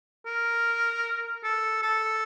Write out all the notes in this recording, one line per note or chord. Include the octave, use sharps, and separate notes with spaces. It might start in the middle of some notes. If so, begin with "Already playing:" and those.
A#4
A4
A4